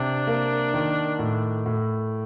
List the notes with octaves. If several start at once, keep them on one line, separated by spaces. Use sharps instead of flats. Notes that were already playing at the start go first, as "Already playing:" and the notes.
Already playing: C3 D4
A#3
D#3
A2
A2